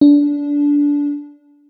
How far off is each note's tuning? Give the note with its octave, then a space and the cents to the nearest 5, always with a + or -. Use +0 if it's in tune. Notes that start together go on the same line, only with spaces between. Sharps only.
D4 -20